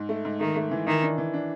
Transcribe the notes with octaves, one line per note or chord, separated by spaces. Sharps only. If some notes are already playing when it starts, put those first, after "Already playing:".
Already playing: G#2
A3
G#2
D#3 A3
A3
E3
D#3 E3
D4
E3
D4